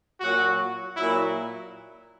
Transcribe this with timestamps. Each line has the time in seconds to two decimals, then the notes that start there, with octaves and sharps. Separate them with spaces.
0.21 A#2 F#3 F#4
0.96 A#2 F#3 E4